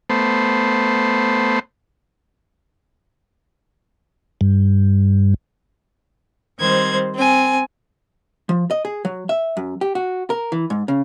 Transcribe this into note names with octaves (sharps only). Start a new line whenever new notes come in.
A3 B3 C5
G2
D#3 G3 C4 C5 G#6
C4 G#5
F3
D#5
G#4
F#3
E5
F#2
G4
F#4
A#4
E3
G#2
C#3